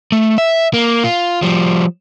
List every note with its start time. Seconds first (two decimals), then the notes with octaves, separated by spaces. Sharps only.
0.12 A3
0.38 E5
0.74 A#3
1.04 F4
1.42 F3 G3